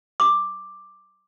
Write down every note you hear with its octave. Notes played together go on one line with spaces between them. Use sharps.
D6